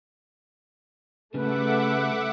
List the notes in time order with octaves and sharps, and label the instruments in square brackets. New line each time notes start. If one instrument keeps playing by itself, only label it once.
[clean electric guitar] C#3 G3 [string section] A3 [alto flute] B4 [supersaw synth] E5 F#5 D6